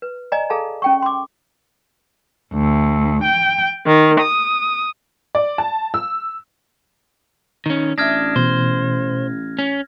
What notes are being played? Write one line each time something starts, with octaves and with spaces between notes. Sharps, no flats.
B4
D5 D#5 G#5 A#5
G#4 A4 F5 A5 A#5
C#4 G5 C#6
C6 D6
D2
G5
D#3
D#6
D5
A5
E6
D#3 C#4 D#4
A1 D4 E5 D#6 F6 G#6 A#6
B2 E3 C5
C#4